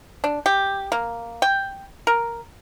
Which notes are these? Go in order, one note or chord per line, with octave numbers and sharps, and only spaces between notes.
D4
G4
A#3
G5
A#4